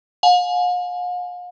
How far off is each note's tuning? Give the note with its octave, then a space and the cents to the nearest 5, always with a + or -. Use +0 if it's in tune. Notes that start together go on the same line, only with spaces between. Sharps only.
F5 +45 G#5 +25